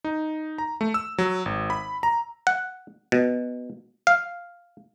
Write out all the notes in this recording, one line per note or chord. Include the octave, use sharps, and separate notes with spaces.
D#4
A#5
A3
E6
F#3
G#1
B5
A#5
F#5
B2
F5